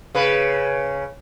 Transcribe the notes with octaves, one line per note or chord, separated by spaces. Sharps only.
C#3 B4